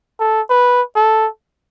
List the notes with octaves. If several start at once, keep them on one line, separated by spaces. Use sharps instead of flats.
A4
B4
A4